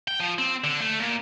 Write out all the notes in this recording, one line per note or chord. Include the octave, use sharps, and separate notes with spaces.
G5
F3
C4
D3
A3
A#2